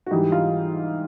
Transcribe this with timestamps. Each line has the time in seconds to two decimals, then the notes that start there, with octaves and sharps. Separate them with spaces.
0.06 F#4
0.11 G#2 E3 G3 G4
0.32 F4